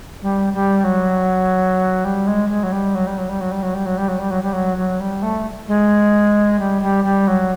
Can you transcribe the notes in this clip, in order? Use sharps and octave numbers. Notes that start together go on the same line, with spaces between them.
G3
G3
F#3
G3
G#3
G#3
F#3
G3
F#3
G3
F#3
G3
F#3
G3
F#3
G3
F#3
G3
F#3
G3
F#3
G3
F#3
F#3
G3
A3
G#3
G3
G3
G3
F#3